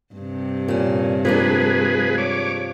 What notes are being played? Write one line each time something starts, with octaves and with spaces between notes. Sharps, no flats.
G2 C3
A#2 C#4
F3 G#3 A#3 D4 G#4 B4
C#5 D6